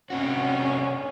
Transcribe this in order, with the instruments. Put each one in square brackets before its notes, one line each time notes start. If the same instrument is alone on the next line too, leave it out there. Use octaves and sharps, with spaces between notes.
[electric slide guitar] C3 D4 F#4 [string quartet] C#4